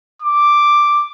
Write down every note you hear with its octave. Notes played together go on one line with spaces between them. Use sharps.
D6